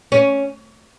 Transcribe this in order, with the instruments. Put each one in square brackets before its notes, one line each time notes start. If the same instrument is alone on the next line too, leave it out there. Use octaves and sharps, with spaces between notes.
[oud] C#4